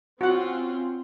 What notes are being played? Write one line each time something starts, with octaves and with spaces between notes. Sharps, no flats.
C4 C#4 F4 F#4 F#5